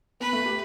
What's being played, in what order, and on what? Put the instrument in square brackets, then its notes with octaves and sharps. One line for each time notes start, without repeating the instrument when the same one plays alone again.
[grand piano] B3 [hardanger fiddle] B4
[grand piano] A3
G4